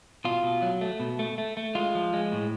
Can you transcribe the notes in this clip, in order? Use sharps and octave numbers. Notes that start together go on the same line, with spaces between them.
B2 F4
B2
F#3
A3
B2
A3
A3
A3
G#3 F4
F3
G#3
A2